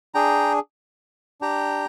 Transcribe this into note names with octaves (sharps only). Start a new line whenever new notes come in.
D4 G#4 G5 A#5
D4 G4 G5 A#5